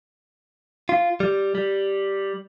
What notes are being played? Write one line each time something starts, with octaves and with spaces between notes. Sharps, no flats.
F4
G3
G3